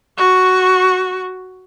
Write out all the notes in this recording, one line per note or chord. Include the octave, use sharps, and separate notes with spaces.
F#4 C#6